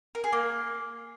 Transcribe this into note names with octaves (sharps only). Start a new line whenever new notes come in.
A#4
G#4
A#3